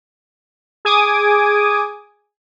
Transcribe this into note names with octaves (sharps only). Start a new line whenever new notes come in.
G#4 G#5 D6 D#6